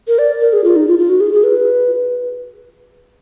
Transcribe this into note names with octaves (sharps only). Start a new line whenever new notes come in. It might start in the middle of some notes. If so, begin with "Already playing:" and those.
A#4
D5
A#4
G#4
F4
D#4
F4
F4
F#4
G#4
G#4
B4